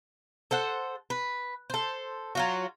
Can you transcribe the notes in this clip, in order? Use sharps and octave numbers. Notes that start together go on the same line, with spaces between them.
A4 C5 F#5
B4
A4 C5
F#3 F4 F#4